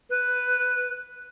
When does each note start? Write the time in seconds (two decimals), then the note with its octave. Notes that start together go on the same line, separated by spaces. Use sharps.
0.09 B4